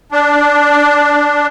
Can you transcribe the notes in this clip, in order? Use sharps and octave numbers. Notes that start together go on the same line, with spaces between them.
D4